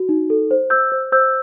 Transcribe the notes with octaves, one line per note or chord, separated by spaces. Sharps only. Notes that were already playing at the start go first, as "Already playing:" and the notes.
Already playing: F#4
D#4
A4
C5
C5 E6 G6
C5
C5 E6 G6